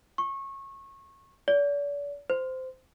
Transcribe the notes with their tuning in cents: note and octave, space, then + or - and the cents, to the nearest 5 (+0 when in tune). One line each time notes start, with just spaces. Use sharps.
C#6 -25
D5 -40
C5 -15